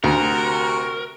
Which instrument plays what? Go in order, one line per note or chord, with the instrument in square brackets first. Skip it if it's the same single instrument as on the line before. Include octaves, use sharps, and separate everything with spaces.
[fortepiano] D2 [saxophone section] C3 F#4 [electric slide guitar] A#4